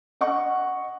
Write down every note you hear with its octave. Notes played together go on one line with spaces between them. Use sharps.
D#5 F#5 C#6